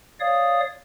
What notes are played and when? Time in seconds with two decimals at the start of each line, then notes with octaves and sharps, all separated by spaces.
0.20 C#5 D5 F5 D#6